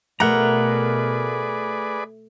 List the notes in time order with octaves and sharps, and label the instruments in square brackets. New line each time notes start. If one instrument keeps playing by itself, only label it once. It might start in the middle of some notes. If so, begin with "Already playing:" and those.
[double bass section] B2 [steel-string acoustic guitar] A3 [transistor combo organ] G#4 B4 D5 [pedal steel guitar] A#4 F#5 A#5